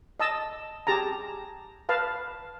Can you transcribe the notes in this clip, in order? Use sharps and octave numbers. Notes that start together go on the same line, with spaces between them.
D#5 A5 E6
G4 G#4 A5 A#5
B4 F5 A5